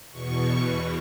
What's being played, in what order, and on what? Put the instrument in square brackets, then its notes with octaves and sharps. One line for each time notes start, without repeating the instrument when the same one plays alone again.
[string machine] E2 B2 C#6